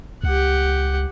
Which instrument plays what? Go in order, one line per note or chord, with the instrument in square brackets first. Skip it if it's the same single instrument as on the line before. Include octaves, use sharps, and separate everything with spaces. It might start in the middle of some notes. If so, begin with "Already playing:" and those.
[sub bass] C#2 [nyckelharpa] G4 F#5